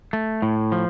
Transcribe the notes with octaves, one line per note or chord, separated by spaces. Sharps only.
A3
A2
F3